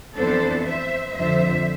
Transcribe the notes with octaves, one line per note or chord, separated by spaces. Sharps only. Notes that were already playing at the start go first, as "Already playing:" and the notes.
F2 E3 B3 D4 A4 C5
C5 E5
F2 D3 F3 C5 E5